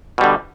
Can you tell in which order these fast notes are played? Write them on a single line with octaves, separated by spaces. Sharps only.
B2 G3 D3